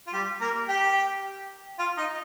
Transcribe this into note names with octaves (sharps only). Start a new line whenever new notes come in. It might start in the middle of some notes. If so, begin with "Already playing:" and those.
F4
G3 G4
A#3 A#4
G4 G5
F4 F5
D#4 D#5